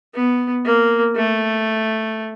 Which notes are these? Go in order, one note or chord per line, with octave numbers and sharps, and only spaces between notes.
B3
A#3
A3